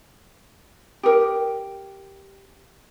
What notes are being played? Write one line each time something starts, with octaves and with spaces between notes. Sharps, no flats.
G4 A#4